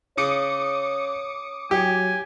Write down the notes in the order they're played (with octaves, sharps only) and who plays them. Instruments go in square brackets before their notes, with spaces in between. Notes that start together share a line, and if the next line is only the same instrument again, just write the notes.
[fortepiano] C#3 [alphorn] C#5 [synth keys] D6 D#6 C#7
[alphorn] F#3 [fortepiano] G4 [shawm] G#5